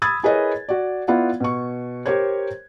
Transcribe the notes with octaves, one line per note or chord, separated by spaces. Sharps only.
B5 D#6 E6 G#6 A6
E4 G#4 A#4 B4 C#5 D#5
F#4 D5
B3 E4 F4 D5 F#5
B2 C#6
G4 A#4 C5 C#5 G#6